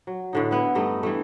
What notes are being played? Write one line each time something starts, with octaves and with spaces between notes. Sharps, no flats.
F#3
A2 D3 D#4
B3 E4
G2 A3 D#4
E3 G3 A3